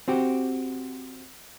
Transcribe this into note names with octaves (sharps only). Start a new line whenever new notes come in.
C4 F#4 G4